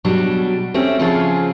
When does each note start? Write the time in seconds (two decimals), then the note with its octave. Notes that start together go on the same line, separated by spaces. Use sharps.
0.04 B2 F#3 G3 D4
0.74 A3 C4 C#4 G4
0.99 C#3 F3 C4 C#4 F4 G#4